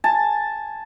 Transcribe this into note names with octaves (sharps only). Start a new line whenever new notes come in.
G#5 A5